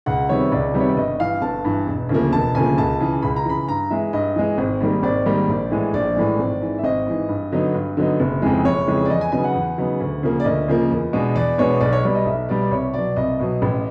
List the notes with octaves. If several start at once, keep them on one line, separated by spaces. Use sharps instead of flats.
C#2 F#5
C3 D#3 G3 B3 C#5
C#2 D5
C3 D#3 G3 B3
C#5
D5
G1 D#5
G2 E3 F5
G1 A5
G2 E3
E1
D2 C#3 F3 A#3
E1 A5
D2 C#3 F3 A#3 G#5
C#2 A5
C#3 E3
C#2 B5
A#5
C#3 E3 B5
G2 A#5
E3 G#3 E5
G2 D#5
E3 G#3
G#1
G#2 D#3 G3 A#3
G#1 D5
G#2 D#3 G3 A#3
A#1
A2 E3 G#3
A#1 D5
A2 E3 G#3
G#1
G#2 E3
E5
G#1 D#5
G#2 E3
G2
D3 F#3 B3 D#4
G2
D3 F#3 B3 D#4
F#1
F2 C#3 E3 G#3
F#1 C#5
F2 C#3 E3 G#3
D5
E2 D#5
G#5
C#3 F#3 B3 D#4 G#5
F#5
E2
C#3 F#3 B3 D#4
D2
C#3 F3 A#3
D5
D2 D#5
C#3 F3 A#3
E2
B2 G#3 B3 D4
E2 D5
B2 G#3 B3 D4 C#5
B1 D5
C#5
B2 G3 D5
D#5
B1 E5
B2 G3 D5
D5
C2 C#5
B2 F#3 D5
C2 D#5
B2 F#3
A1